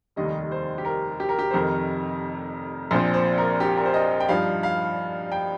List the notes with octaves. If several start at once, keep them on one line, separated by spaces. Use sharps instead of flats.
F1 D#2 D#3 G3 D#5
C5
G4
A#4
G4
A#4
G4
C5
F1 F2 C3 D#3 A#4
A#1 A#2 F3 C4 C5
C5
A#4
G4
A#4
C5
D#5
G5
G2 F3 D#4 F5
F5
G5